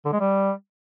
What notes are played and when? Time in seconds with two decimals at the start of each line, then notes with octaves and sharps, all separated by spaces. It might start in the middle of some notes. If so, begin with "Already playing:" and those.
0.05 D3
0.13 G#3
0.20 G3